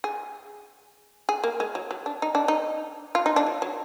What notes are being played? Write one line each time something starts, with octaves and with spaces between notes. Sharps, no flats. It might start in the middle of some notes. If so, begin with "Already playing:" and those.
G#4
G#4
A#3
G#3
F#3
F#3
D4
D#4
D4
D#4
F4
D#4
D4
F#3
F#3